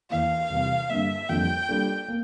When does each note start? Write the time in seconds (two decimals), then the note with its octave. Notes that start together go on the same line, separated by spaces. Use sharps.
0.10 E2 E3 A#3 F5
0.50 E2 C3 G3
0.90 G2 D3 G3 A#3 E5
1.29 F2 D3 G3 A#3 G5
1.69 G3 A#3 D4 F4 A4
2.08 A#3